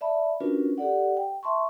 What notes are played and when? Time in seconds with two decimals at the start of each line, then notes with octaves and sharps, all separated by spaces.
0.01 D5 E5 A5 B5
0.40 C#4 D4 F4 F#4 A#4 B4
0.78 G4 A4 D5 F#5
1.17 G5
1.43 E5 A5 C6 C#6